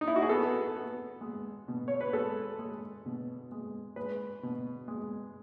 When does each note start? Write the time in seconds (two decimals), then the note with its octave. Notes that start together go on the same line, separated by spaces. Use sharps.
0.01 D#4
0.08 E4
0.16 F#4
0.22 G#4
0.29 B3 A4
0.76 B3
1.21 G#3
1.68 B2
1.88 C#5
2.01 B4
2.13 G#3 A4
2.59 G#3
3.06 B2
3.52 G#3
3.96 G#3 B4
4.43 B2
4.88 G#3